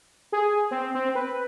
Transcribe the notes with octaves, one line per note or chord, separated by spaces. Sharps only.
G#4
C4
C4
B4